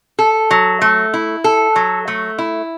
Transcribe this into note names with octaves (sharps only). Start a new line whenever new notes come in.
A4
F#3
A3
E4
A4
F#3
A3
E4